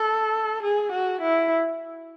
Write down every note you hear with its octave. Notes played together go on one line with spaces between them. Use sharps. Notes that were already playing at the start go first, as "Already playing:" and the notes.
Already playing: A4
G#4
F#4
E4